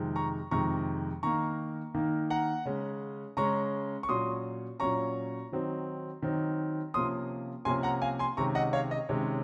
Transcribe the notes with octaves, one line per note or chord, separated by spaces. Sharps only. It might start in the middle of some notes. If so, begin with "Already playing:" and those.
Already playing: F2 C3 D#3 G#3
A#5 C#6
F2 C3 D#3 G#3 A#5 C#6
D#3 A#3 D#4 A#5 C#6
D#3 A#3 D#4
F#5 A#5
C#3 G#3 C#4
C#3 G#3 C#4 A#5 C#6
C#6
A#2 F#3 C#4 C6 D#6
A#2 F#3 C#4 A#5 C#6
D#3 F#3 C4 D#4
D#3 F#3 C4 D#4
C3 F3 A#3 C#4 C6 D#6
C3 F3 A#3 C#4 G#5 C6
F#5 A#5
F5 G#5
G#5 C6
C3 D#3 G#3 C#4 A#5 C#6
D#5 F#5
C#5 F5
D#5
C3 D#3 G#3 C#4 C#5